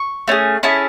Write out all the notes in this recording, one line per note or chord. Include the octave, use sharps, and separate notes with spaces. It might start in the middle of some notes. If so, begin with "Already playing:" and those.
Already playing: C#6
A3 C#4 G#4
C#4 E4 G#4 A5